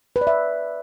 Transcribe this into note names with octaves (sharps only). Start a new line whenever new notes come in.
B4
D5
E5